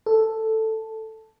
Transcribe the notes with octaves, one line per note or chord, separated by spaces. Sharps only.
A4